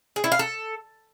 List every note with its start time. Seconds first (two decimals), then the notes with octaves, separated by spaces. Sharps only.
0.16 G#4
0.24 E4
0.32 F5
0.39 A4